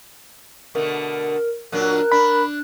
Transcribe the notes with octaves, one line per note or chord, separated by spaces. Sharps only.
B2 D3 A3 A#4
A#2 F#3 D4 A#4 F#6
D4 B5